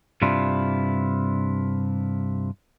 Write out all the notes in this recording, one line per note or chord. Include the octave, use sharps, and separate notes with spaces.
G2 C3 D4 E4 F4